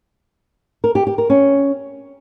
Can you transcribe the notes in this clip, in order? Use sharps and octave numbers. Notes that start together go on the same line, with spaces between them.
A#4
G4
G4
A#4
C#4